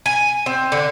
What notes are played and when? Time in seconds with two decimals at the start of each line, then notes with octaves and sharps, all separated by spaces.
0.06 G#5
0.46 C4
0.72 D3